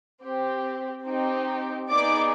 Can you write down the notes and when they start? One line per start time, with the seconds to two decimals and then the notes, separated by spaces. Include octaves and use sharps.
0.23 C4 G4
1.06 C4 D#4 G4
1.90 B3 D#4 G#4 D5 D6